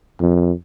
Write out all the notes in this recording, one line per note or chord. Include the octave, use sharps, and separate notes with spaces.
F2